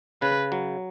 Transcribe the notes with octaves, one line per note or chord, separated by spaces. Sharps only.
C#3 B4
F#3